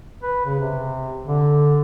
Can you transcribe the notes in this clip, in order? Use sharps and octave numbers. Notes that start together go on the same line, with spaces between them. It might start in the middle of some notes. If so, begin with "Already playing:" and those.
B4
C#3
C3
D3